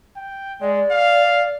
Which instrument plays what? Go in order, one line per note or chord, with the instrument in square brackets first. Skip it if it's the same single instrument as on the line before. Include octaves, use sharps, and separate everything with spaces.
[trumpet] G5
[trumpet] G#3 [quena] D5
[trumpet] F5